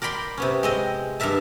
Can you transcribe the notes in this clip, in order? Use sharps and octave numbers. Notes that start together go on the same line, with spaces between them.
A#4 D5 G5 B5 C6
C3 B3 C#4
G#3 C4 D#5
G2 B3 A#4 E5 A5